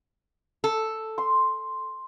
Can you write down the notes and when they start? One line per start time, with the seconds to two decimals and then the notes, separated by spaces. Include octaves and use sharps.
0.64 A4
1.18 C6